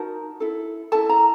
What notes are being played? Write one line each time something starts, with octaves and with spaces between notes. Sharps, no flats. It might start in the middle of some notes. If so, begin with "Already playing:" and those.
Already playing: D#4 F#4 A#4 A5
E4 A4
E4 A4 A5
A#5